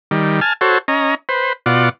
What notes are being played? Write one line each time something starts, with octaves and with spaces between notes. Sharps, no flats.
D#3 G3
G#5 A5 F6
F#4 A4 C5 C#5
C#4 D#5 A#5
B4 C5
B2 F4 D5 F#5